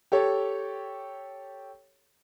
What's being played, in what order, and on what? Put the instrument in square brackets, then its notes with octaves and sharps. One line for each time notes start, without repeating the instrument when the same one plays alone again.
[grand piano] G4 A4 C#5